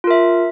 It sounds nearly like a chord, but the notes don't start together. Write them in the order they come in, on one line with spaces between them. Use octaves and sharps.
F4 A#4 E5